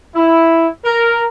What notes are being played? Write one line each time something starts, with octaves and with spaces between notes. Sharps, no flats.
E4
A#4